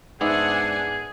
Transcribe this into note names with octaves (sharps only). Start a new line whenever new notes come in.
G#2 B3 D4 G#4 D5 E5 F#5 G#5